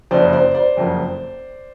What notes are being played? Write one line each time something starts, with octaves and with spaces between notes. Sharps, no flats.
F#1 F2 C#3 C5 D5
C5 D5
C5 D5
F#1 F2 C#3 F#3 A#3